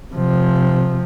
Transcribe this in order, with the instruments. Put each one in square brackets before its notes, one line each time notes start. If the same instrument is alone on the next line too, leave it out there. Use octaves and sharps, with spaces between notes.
[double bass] C3 F3